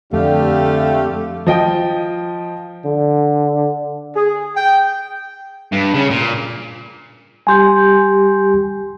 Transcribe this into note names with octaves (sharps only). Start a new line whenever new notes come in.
F2 D3 A3 G4 F5
F3 D#5 G5
D3
G#4
G5
G2
C#3
A#2
G3 G4 G#5 C6 G6